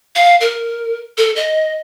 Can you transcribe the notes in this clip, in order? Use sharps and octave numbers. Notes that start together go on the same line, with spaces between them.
F5
A#4
A4
D#5